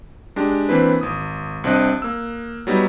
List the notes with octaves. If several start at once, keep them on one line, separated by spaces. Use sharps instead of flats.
G#3 D4 G4
E3 A#3 C4 D4 E4 B4
G#1 D#6
C2 C4 D4 D#5 F#6
A#3 E6
F#3 G3 B3 D#4